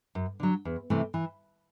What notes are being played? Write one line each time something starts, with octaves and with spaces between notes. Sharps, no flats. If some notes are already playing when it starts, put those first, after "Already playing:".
F#2
D3 F#3
E2
C3 E3 A3
E3